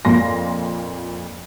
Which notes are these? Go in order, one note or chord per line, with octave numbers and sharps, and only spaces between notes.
F2 A#2 C6 A#6